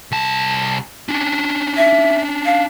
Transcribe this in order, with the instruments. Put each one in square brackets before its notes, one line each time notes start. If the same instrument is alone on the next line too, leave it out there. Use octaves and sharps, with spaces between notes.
[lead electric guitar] C2 A5
C#4 D4
[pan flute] E5
F5